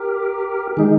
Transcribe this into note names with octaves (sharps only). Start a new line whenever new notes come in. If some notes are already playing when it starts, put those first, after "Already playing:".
Already playing: G4 A#4
D#3 G#3 D#4 G#4